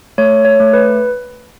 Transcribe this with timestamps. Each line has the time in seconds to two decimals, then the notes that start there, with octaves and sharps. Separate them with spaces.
0.18 A3 C#5
0.45 C#5
0.60 A3
0.73 B4